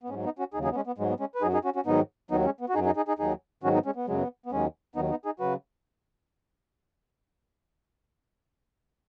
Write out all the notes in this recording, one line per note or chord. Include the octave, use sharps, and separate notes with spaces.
B3
G#2 F#3 G#3 C#4
B3 D#4
C#4 F#4
D#2 C#3 F#3 D#4 G#4
D#4 G#4
B3
G#3 C#4
B3
G#2 F#3 G#3
B3
G#3 C#4
B4
F#2 F#3 D#4 G#4
D#4 G#4
C#4 F#4
C#4 F#4
G#2 D#3 F#3 B3 D#4
D#2 D#3 F#3 B3 D#4
G#3 C#4
B3
F#4
F#2 F#3 D#4 G#4
D#4 G#4
D#4 G#4
D#4 G#4
D#2 D#3 F#3 D#4 G#4
G#2 D#3 F#3 C#4 F#4
B3 D#4
G#3 C#4
B3
F#2 C#3 F#3 G#3
B3
B3
D#2 D#3 F#3 G#3 C#4
D#2 D#3 F#3 B3 D#4
B3 D#4
D#4 G#4
C#3 F#3 F#4 B4